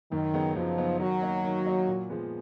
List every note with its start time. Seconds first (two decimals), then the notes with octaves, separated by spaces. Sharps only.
0.12 F#2 D#3
0.34 C#3 F#3 B3 D#4
0.56 F#2 F3
0.77 C#3 F#3 B3 D#4
1.00 D#3 F#3
1.22 A#3 D#4
1.44 D#3
1.66 A#3 D#4
1.88 A#2
2.10 F3 G#3 B3